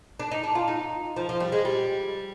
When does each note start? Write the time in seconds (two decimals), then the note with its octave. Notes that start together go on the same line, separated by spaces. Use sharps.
0.20 D4
0.31 D#4
0.44 D4
0.55 F4
0.68 D#4
1.16 F3
1.29 F3
1.40 G3
1.52 G#3
1.65 G3